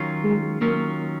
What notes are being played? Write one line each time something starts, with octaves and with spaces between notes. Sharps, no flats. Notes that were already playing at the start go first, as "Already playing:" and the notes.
Already playing: D#3 F#3 C#4 F4
G#3
D#3 F#3 A#3 C#4 F4